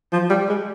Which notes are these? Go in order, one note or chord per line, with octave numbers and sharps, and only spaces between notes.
F3
G3
G#3